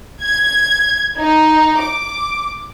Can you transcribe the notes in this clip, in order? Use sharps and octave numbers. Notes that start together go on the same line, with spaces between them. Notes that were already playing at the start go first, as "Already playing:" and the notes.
G#6
D#4
D6